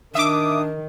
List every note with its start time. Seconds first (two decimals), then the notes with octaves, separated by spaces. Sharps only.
0.15 D#3 D4 E5 D6 D#6